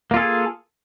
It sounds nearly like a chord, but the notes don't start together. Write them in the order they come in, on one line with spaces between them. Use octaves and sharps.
A#3 F4 A4 G#4